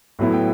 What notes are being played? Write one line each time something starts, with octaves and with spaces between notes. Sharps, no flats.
A2 F#3 B3 E4
G5